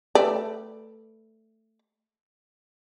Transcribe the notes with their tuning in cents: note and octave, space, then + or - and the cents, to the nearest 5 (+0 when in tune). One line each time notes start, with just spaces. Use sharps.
A3 +10 B4 +0 D5 +0